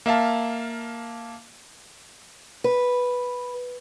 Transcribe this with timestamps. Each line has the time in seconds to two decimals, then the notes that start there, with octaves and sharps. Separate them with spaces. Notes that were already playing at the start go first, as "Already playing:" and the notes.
0.06 A#3 E5 F5 A5
2.64 B4